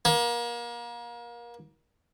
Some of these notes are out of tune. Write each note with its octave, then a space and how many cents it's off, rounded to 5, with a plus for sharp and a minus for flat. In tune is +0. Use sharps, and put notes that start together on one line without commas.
A#3 +30